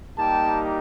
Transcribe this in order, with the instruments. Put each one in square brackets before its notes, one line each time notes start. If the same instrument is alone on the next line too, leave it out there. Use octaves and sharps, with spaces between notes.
[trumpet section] G3 A#3 D#4 G4 G5 A5